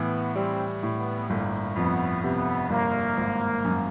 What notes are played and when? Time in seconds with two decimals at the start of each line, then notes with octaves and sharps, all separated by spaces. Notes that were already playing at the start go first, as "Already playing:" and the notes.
Already playing: A2 E3 B3
0.35 G3 C4
0.83 A2
0.98 B3
1.29 G1 A#3
1.76 F2 B3
2.23 C3 B3
2.70 G1 A#3
3.17 G#1
3.65 F#2